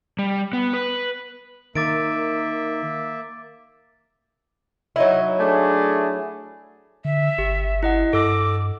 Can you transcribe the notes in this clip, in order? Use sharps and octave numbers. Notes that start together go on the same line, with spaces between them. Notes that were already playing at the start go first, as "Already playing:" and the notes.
G3
B3
B4
D#3 A#3 E5 D6 A6 D7
F#3 D#4 E4
A3 D4 G#4
D3 E5
G1 G4
E4 D#5 F#5
G2 A4 D6 E6